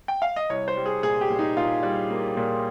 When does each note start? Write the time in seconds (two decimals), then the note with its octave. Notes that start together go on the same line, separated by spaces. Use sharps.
0.08 G5
0.22 F5
0.36 D#5
0.49 C2 C#5
0.68 C5
0.77 G3
0.86 G#4
1.03 A#2 G#4
1.21 G4
1.30 A#2
1.39 D#4
1.57 A#2 F4
1.83 G3
2.10 A#3
2.37 A#2